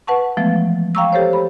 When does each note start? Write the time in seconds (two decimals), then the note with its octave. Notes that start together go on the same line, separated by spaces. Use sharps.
0.07 B4 F#5 A5 C#6
0.37 E3 F3 G#3 A3 B3
0.95 F5 G5 A#5 C#6 D6 E6
1.13 G4 A4 C5 C#5
1.33 B5